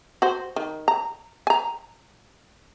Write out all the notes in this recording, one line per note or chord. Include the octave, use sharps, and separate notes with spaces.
F#4 C5
D#3
A#5
G#5 A#5